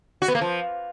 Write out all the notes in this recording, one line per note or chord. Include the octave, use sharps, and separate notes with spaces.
F#4
B3
A#3
F3